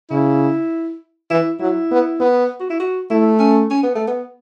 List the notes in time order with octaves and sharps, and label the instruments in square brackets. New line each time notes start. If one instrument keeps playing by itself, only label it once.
[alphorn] C#3 [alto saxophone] E4
[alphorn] E3 [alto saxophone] E4
[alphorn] F#3 [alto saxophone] E4
[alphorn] B3
B3
[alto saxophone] F#4
E4
F#4
[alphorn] A3 [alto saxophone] E4
[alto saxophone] C#4
C#4
B3
A3
B3